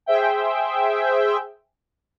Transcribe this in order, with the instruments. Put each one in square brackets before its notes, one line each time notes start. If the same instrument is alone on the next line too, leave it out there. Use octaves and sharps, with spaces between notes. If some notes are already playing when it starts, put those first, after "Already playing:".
[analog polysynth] G#4 C5 E5 G5